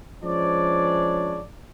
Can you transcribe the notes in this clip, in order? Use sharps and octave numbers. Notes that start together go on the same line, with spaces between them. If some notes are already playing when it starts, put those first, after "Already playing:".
F3 G#3 C#4 D4 C#5 D5